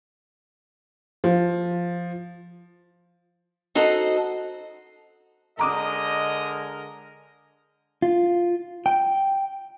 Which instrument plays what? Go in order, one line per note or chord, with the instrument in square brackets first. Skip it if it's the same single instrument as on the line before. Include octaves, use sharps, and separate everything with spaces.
[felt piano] F3
[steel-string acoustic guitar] D#4 F#4 A4 C5 D#5
[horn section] D3 G#3 A#4 [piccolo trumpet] D#5 [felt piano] A#5 D6 D#6
[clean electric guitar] F4
G5